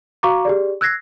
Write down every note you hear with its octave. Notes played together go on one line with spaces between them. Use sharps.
F#4 F5 A#5 C#6 D6
G4 G#4 D5
E6 F#6 G#6 A#6 C7